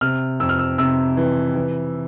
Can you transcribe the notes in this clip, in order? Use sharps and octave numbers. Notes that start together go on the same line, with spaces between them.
C3 F6
F2 E6
F6
E6
C3 E6
E3
E3